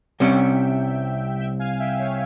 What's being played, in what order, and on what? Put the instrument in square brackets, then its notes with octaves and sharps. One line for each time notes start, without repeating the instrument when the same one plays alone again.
[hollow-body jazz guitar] C2 C3 G3 C#4 [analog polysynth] E5 G5
[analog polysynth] E5 G5
F5 G#5
E5 G5
C#5 F5